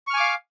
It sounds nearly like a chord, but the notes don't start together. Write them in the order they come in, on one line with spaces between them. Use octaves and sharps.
C#6 F6 G#5 D6 F5